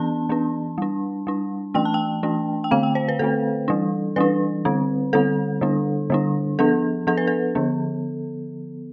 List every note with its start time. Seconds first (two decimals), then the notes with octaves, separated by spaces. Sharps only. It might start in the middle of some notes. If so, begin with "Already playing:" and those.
Already playing: E3 B3 D4 A5
0.29 E3 B3 D4
0.78 G3 D4
1.27 G3 D4
1.74 E3 A3 D4 G5
1.85 A5
1.94 G5
2.23 E3 A3 D4
2.64 G5
2.71 D3 A3 C4 F5
2.83 G5
2.95 C5
3.08 B4
3.19 D3 A3 C4 A4
3.68 E3 G3 D4
4.16 E3 G3 D4 B4
4.65 D3 G3 C4
5.13 D3 G3 C4 A4
5.61 D3 G3 D4
6.10 D3 G3 D4
6.59 F3 B3 D4 A4
7.07 F3 B3 D4 A4
7.17 B4
7.27 A4
7.55 D3 F3 B3